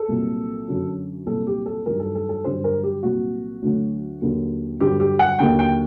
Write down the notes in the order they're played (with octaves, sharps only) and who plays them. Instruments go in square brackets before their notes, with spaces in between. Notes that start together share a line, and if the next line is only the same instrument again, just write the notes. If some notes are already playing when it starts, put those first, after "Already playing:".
Already playing: [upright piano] A4
C2 A#2 F#3
F#2 D3 F#3
C2 A#2 F#3 A4
G4
A4
G2 D#3 F#3 A#4
A4
A4
A4
G2 D3 F#3 C5
A#4
G4
C2 A#2 F#3 F#4
D2 D3 F#3
D#2 D3 F#3
G2 D3 F#3 G4
G4
F#5
D#2 D3 F#3 G5
G5